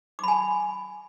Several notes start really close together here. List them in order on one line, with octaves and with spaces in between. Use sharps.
D6 B5 G#5